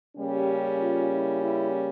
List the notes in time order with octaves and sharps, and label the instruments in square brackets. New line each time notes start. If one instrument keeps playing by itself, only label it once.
[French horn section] C#3 G3 A#3 C#4 G4
F4
E4
E4